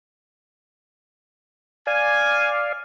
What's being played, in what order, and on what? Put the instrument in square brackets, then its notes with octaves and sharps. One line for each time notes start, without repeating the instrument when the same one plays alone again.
[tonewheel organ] D5 F5 [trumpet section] G#5